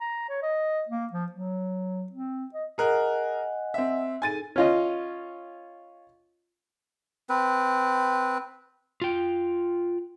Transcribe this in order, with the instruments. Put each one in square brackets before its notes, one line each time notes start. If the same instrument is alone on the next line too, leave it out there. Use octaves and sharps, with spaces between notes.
[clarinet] A#5
C#5
D#5
A#3
F3
F#3
C4
D#5
[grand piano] G#4 A#4 F#6 [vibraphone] D#5 F#5 G#5
[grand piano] C4 E5
[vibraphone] D#4 G#4 A4 [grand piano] G#5 A6 D#7
[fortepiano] C#4 F4 D#5
[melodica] C4 B4
[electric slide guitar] F4 G5